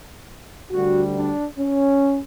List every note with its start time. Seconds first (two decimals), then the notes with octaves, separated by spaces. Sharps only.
0.72 D2 D3 G3 F#4
1.15 D4
1.58 C#4